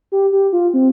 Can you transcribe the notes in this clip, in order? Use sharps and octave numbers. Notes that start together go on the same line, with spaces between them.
G4
G4
F4
C4